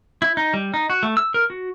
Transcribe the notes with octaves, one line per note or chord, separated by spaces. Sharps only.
E4
D#4
G3
D#4
F#4
A3
E6
A#4
F#4